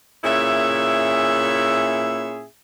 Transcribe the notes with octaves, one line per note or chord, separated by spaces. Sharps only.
A#2 C#4 E4 G#4 E5